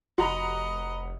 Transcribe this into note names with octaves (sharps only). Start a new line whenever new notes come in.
F1 F#4 D#5 F#5 A#5 B5